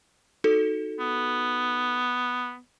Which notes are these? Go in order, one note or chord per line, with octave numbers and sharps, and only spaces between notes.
D#4 F#4 A4
B3